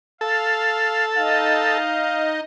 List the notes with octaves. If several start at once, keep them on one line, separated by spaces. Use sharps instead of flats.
A4 F5
D#4 D#5 F5